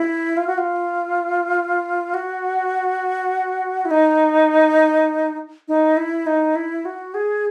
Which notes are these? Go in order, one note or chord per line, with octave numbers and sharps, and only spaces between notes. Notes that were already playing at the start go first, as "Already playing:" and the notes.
Already playing: E4
F4
F#4
F4
F#4
E4
D#4
D#4
E4
D#4
E4
F#4
G#4